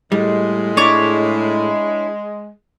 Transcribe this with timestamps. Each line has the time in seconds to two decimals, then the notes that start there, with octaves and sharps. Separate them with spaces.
0.12 A2 G3 G#3
0.77 D4 E4 C#5 D6